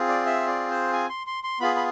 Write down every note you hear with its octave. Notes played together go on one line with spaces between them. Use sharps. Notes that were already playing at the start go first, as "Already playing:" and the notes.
Already playing: C4 F4 G#4
D5
E5
D5
C5
G#5
C6
C6
C6
B3 F4 G#4 B5
B5